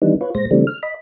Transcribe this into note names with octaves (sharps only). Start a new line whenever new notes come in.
D#3 E3 G3 B3 D4 D#4
F4 B4 C#5
A#2 G#3 C5 A#6
C#3 E3 G3 A3 C4 D4
F6
D#5 B5